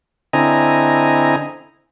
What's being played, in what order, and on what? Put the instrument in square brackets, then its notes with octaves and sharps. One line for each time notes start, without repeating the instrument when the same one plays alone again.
[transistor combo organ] D3 C4 E4 D#5 G#5 A#5